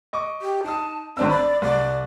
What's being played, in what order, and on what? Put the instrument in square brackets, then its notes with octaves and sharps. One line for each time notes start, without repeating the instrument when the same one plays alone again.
[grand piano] D#5 C#6 D6
[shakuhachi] G4
[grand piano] D#4 D#6 [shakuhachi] A5
[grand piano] G#1 D4 E6 [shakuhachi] C4
[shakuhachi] D5 [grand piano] B5
[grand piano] C2 [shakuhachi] D5